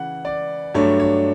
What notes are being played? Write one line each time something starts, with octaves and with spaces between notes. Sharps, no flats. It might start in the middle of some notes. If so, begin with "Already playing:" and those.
Already playing: C#3 E3 F#5
D5
G2 F#3 A3 D4 C#5
C#5